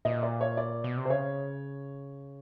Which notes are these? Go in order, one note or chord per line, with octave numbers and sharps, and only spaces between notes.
A#2 D#5
D5
C#5
D5
B2
C3
C5
C#3 C#5